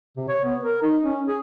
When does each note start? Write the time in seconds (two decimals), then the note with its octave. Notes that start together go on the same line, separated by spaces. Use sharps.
0.17 C3
0.29 C#5
0.45 B3
0.63 A#4
0.82 D#4
1.03 C#4
1.28 G#4